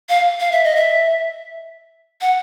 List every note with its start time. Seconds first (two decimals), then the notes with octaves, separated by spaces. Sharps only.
0.09 F5
0.40 F5
0.52 E5
0.64 D#5
0.76 E5
2.21 F#5